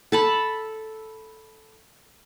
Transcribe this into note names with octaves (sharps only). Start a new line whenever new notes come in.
A4 A5 B5